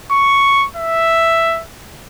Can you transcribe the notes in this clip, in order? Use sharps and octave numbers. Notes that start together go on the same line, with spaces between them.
C#6
E5